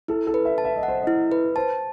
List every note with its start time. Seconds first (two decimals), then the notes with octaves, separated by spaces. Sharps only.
0.08 E4 A4
0.27 A4
0.34 B4
0.45 E5
0.58 A5
0.64 E5
0.77 D#5
0.83 F#5
0.88 C5
1.02 D#5
1.07 E4
1.32 B4
1.56 C5 A5